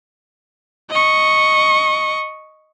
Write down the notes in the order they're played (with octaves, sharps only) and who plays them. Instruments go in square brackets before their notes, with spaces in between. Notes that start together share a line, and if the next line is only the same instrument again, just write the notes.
[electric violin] D#5 C#6